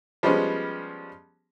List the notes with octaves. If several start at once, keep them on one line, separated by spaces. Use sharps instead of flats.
F3 G3 G#3 B3 C#4